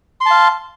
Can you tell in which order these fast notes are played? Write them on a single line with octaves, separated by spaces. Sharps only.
C6 A5 F5